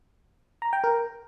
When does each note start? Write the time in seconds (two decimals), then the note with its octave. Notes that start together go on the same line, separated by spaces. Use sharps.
0.62 A#5
0.73 G5
0.84 A#4